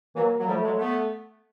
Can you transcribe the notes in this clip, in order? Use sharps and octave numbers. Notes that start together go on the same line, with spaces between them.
E3 F#3 A#3
F#3
F3 G3 A3
F#3 G#3
A3 B3